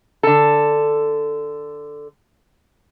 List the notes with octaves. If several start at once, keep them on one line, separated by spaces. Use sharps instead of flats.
D3 A4